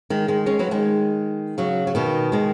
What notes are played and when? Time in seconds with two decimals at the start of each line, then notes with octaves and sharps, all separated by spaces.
0.10 D#3 G#3
0.28 D#3 G#3
0.46 G#3 C#4
0.59 F#3 B3
0.71 D#3 G#3
1.58 C#3 F#3
1.87 F#3
1.95 B2 D#3
2.32 D#3 G#3